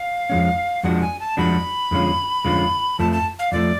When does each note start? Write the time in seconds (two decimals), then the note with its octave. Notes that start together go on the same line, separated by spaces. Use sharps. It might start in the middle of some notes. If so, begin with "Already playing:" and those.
Already playing: F5
0.30 F2 F3 G#3 C#4
0.83 F2 F3 G#3 D4 F#4 F#5
1.01 G#5
1.20 A5
1.37 F2 F3 G#3 D4 F#4 B5
1.91 F2 D3 G#3 C#4 F4
2.45 F2 D3 G#3 C#4 F4
2.99 F2 F3 A3 A5
3.12 A5
3.39 F5
3.52 F2 F3 A3 D5